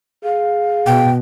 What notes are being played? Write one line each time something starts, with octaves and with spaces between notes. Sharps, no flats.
G#4 F5
B2 G5